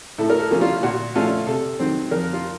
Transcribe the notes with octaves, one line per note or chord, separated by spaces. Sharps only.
A2 A4
A#4
A4
F3 A#3 C#4
F4
A#2 F#4
F3 A3 C#4 F4 A4
C3 A4
D#3 F#3 C4
F2 A#4
F4